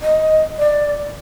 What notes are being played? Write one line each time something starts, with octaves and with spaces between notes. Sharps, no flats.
D#5
D5